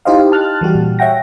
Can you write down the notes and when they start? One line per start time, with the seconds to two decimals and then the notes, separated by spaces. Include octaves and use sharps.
0.05 D#4 E4 G4 C5 D#5 F5
0.32 A5 F6 F#6 A6
0.61 E3 G3 F#4 G4
0.75 A#2
0.99 C#5 E5 F#5 G5 A#6